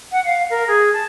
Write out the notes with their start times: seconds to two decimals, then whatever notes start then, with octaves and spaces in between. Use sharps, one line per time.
0.12 F#5
0.25 F5
0.50 A#4
0.68 G#4
0.93 A5